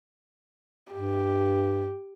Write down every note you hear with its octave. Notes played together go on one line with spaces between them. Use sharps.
G2 G4